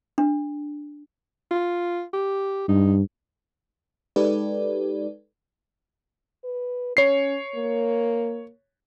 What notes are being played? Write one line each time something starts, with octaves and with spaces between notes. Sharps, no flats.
D4
F4
G4
G2 D#4
G#3 D#4 G4 A4 B4 D5
B4
C#4 C#5 C7
A#3